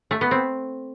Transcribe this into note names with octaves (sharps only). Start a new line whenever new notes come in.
A3
B3
C4